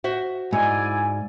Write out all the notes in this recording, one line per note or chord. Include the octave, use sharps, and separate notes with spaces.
F#4 C5 E5
G#2 E4 D5 G#5